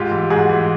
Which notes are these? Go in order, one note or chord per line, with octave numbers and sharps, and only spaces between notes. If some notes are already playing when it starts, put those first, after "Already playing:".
Already playing: G#2 F4 G4
E3
G#2 F#4 G#4
E3